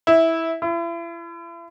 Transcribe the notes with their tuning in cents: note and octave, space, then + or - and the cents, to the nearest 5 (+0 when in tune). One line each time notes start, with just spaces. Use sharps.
E4 -10
E4 +40